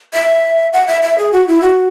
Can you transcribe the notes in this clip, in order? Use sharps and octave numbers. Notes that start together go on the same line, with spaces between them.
E5
F#5
E5
E5
G#4
F#4
E4
F#4